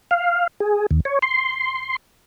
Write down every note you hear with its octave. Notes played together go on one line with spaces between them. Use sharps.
F5
G#4
D#2
C#5
C6